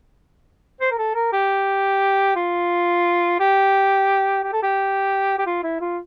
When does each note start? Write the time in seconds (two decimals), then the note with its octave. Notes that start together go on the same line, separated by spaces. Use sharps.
0.81 C5
0.91 A#4
0.98 A4
1.15 A#4
1.32 G4
2.36 F4
3.40 G4
4.43 G4
4.52 A4
4.63 G4
5.38 G4
5.46 F4
5.63 E4
5.80 F4